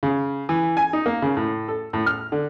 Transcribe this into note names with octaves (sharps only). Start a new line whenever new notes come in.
C#3
E3
G#5
D#4
A#3
C#3
A2
A4
A2
F6
D3